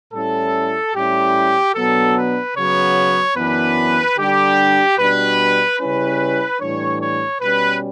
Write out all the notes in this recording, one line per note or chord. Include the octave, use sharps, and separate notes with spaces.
A2 G3 C#4 E4 A4
A2 G3 C#4 E4 G4
B2 F#3 B3 D4 A4
B4
C#3 F#3 B3 C#5
F#2 E3 B3 D4 B4
D3 G3 D4 G4
B2 G3 D4 B4
C#3 G3 C#4 E4 B4
A2 E3 G3 D4 C#5
C#5
B2 G3 C#4 B4